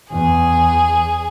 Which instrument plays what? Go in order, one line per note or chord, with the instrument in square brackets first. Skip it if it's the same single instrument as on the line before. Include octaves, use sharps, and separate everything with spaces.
[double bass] E2 [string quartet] G#4